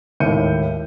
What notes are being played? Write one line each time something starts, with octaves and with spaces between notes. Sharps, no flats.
G#1 D#2 A2 G6 C#7 D#7